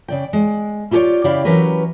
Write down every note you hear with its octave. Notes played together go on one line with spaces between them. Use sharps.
C#3 D5 G5
G#3
E4 F4 G4 A4 C#5 D5
C#3 E4 G4 D5 F5 G5
E3 F#3 C#4 G4 A#4 B4